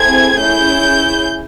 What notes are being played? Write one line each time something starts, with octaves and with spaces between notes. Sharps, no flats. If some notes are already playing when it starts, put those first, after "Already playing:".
Already playing: A3 C4 E4 G#4 G#6
C#4 E4 G#4 G6